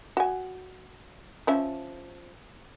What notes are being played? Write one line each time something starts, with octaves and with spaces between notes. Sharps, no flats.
F#4 G#5
F3 C#4 E5